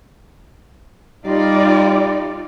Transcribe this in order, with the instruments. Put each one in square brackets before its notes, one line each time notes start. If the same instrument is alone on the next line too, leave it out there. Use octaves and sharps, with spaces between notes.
[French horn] G3 [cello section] D#4 F4 D5